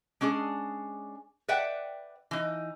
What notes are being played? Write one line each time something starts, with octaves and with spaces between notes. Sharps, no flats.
G#3 C#4 D4 G#4
B4 D5 E5 F#5 G5
E3 D#4